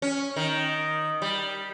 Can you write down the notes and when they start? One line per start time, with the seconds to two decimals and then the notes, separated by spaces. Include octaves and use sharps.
0.02 C#4
0.36 D#3
1.22 G3